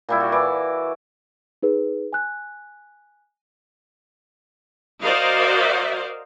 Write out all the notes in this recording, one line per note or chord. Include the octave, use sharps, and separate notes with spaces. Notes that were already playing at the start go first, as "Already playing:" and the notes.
A#2 G3 E4
F#4
E3 D5
D#4 G#4 B4
G#5 F#6
F#4 A#4 C5 D5 D#5 F5